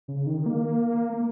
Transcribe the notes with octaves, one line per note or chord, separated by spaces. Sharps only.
C#3
D#3
A#3
A#3